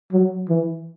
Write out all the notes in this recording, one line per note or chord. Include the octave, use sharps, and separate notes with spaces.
F#3
E3